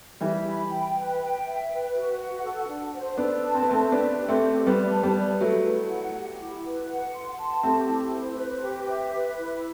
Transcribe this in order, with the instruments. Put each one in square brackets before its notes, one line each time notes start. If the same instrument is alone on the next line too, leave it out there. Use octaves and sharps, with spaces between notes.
[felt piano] E3 G3 [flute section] E5
[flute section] B5
G5
B4
G5
E5
B4
F#4
F#5
A4
D4
C5
[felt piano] B3 D4 [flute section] A4
[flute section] A5
[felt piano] C4
B3
[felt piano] A3 C4 [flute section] E5
[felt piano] B3 D4 [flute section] B4
[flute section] G4
[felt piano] A3 C4
[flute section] D5
[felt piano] G3 B3 [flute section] G4
[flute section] A5
[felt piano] G3 B3
[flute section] D5
[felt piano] F#3 A3 [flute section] B4
[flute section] E4
F#5
G4
E4
B4
F#5
C6
A5
[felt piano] A3 C4 [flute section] G4
[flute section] E4
C5
B4
G4
E5
B4
E4